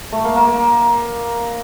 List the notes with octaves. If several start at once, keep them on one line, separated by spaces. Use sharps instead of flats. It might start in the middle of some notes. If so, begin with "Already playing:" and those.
A3
A#3
A#3
A#3